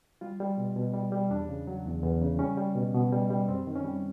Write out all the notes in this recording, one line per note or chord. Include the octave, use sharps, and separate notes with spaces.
G3 F4
G3
B2
B2
G3
G3
E2 D4
C#3
F#3
E2
E2
C#3
G3 C#4
G3
B2
B2
G3
G3
F#2 C4
D#3
C#4
G3